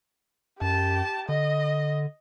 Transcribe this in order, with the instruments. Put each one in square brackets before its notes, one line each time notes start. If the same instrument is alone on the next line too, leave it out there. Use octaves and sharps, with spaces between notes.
[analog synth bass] F#2 [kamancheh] G4 A5
[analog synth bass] D3 [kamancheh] D#5